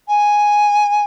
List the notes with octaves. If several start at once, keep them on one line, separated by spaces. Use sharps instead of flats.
G#5